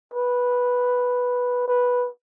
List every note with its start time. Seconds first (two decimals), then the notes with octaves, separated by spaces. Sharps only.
0.14 B4
1.68 B4